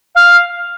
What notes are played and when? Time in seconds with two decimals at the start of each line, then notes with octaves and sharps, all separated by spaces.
0.15 F5